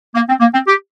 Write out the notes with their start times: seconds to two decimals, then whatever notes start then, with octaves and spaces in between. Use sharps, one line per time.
0.15 A#3
0.28 C4
0.40 A#3
0.53 C4
0.68 G4